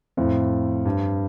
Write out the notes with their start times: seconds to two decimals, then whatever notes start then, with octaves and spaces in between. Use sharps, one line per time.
0.17 F2 A2
0.86 G2